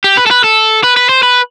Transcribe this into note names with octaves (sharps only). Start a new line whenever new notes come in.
G4
B4
A4
B4
A4
B4
B4
C5
B4